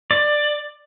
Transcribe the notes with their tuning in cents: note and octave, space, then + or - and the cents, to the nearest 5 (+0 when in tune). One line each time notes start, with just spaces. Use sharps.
D5 +15